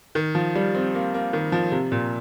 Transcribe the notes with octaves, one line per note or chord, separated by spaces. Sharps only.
D#3
F3
G3
C4
A#3
A#3
D#3
F3
C3
A#2